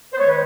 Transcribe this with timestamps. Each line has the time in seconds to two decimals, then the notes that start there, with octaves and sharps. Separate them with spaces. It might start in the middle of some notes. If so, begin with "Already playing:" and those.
0.13 C5
0.18 D#3 G#3 B3 C#5
0.27 B4